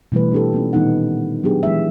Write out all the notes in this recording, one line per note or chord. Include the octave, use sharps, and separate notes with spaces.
B2 E3 G3 A3 B4
C4 D4 G4 A4
A#3 B3 C#4 F4
A#2 D#3 G3 B3 D#4 F#5
F#3 B3 D4 G4 G#4
E3 G#3 E5